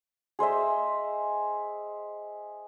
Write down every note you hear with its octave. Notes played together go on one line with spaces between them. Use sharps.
G#4 C5 D#5 E5